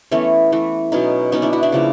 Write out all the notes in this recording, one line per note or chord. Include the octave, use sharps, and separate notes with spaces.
E3 A3 B3 C#4
E3 A3
B2 F#3 B3 C#4 D#4
B2 F#3 B3 C#4 D#4
D4 E4
E4 F#4
D4 E4
C#3 F3 A#3